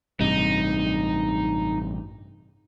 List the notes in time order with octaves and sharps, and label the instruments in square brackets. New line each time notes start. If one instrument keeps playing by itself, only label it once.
[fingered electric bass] A1 G2 C3 [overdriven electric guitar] D#4